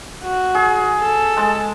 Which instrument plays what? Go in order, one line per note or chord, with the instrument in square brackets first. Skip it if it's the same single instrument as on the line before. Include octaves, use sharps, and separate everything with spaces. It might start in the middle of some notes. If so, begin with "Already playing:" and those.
[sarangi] F#4
[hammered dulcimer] G#4
[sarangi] A4
[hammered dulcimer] G#3 A5